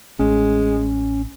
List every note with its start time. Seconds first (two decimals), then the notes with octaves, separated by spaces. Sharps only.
0.19 A1 G#3 C#4